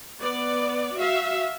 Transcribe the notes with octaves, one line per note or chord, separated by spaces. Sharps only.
B3 D5
F#4 E5 F5